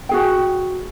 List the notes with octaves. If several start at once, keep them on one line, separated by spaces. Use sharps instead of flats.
F#4 G#4 G5